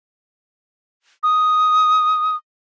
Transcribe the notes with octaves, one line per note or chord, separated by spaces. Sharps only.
D#6